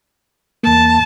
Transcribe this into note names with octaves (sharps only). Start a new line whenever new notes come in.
E2 A#3 A5